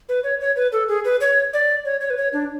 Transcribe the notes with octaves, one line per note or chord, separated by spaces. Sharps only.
B4
C#5
C#5
B4
A4
G#4
B4
C#5
D5
C#5
C#5
B4
C#5
D4